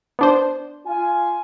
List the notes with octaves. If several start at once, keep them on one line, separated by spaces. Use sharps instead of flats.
B3 D4 C5
F4 G#5